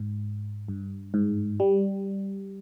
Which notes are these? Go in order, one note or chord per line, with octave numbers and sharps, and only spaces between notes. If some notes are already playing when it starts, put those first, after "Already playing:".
Already playing: G#2
G2
G#2
G3